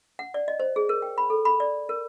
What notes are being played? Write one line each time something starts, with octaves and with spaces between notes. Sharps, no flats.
F#5
D5
D#5
C5
G#4
A#4
G5
B5
A4
B5
D5
A#4